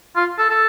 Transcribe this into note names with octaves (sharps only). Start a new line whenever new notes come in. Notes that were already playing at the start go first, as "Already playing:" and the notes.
F4
A4
A4